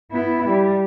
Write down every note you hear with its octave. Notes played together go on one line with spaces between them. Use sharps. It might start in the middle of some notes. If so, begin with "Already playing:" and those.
B3 E4
G3